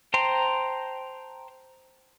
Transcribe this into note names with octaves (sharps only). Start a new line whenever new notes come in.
C5 G5 A5 A#5 C6